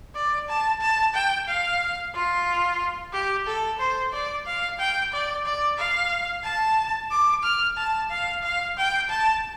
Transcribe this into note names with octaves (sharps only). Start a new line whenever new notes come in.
D5
A5
A5
G5
F5
F4
G4
A4
C5
D5
F5
G5
D5
D5
F5
A5
D6
F6
A5
F5
F5
G5
A5